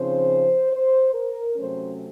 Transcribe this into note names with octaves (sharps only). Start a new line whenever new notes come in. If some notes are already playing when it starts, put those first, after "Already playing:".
Already playing: C#3 F3 C4 D#4 C5
C5
A#4
C3 F#3 A3 C#4 C5